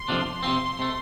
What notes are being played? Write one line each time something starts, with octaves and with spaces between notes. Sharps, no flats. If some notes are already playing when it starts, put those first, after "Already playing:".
Already playing: C6
F2 C3 F3 D4
C3 F3 C4 C6
C3 A3